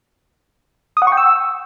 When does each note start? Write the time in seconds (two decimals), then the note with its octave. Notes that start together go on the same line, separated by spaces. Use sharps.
0.97 D#6
1.02 F#5
1.07 C#6
1.12 G5
1.17 E6